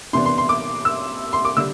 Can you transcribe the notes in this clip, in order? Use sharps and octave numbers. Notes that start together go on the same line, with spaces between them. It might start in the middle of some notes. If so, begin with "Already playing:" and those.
C3 E3 B3 D4 C6
C6
C6
D6
E6
C6
D6
D3 G3 D4 E6